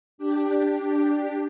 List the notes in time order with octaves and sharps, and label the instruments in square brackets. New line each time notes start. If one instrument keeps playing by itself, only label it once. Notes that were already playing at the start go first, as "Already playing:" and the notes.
[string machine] D4 G4